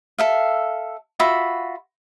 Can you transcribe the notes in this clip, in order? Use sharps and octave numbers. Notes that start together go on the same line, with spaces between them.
A4 E5 F5
F4 F#4 E5 B5